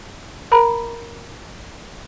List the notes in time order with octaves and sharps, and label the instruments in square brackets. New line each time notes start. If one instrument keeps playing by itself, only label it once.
[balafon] A#4 A#5 B5